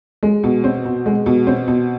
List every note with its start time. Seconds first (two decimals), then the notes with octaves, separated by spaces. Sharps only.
0.23 G#3
0.44 B2
0.64 C4
0.85 B2
1.06 G#3
1.26 B2
1.47 C4
1.68 B2